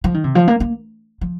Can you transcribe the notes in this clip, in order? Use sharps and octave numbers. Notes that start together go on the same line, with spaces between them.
F3
D#3
C3
F3
A#3
A#3
F3